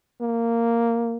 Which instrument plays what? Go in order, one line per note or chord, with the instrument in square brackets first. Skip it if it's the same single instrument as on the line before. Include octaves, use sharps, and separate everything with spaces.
[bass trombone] A#3